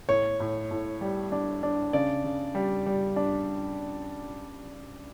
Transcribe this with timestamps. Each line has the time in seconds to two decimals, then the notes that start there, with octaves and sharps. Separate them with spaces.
0.09 A2 C#5
0.40 A2
0.71 A2
1.01 G3
1.32 D4
1.63 D4
1.93 C#3 D5
2.24 C#3
2.55 G3
2.86 G3
3.16 D4